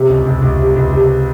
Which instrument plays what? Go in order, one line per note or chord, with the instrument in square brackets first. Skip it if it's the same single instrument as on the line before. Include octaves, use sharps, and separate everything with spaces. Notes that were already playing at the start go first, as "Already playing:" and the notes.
Already playing: [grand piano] C3
C#2
C#2
C#2
C3
C#2
C3